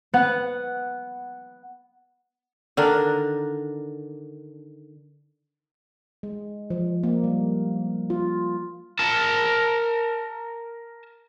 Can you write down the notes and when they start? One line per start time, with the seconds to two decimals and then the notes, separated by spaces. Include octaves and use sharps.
0.13 B3 F#5
2.77 D3 D#3 D4 A#4
6.23 G#3
6.70 F3
7.03 A#3
7.24 G3
8.10 F4
8.99 A#4 A5